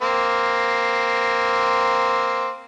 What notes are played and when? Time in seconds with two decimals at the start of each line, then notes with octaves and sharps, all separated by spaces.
0.02 A#3 C4